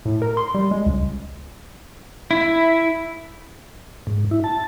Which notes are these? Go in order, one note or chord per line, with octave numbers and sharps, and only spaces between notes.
A2
A#4
C6
G3
G#3
C#2
E4
G#2
E4
A5